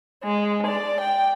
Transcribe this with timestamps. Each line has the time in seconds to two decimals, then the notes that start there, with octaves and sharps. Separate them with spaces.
0.24 G#3
0.66 D5
1.00 G5